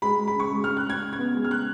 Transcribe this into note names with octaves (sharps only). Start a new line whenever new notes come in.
G#3 B5
G#3
B5
C#3 C#6
G#3
C#3 F6
F#6
C#3 G#6
C#3
G#6
B3
G#3
F6
C#3 F#6